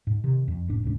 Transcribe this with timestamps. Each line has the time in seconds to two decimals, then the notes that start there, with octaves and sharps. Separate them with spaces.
0.07 G#2
0.24 C3 D#3
0.48 F2
0.67 F#1 A2 D4
0.83 D1 C#2 G#2 D4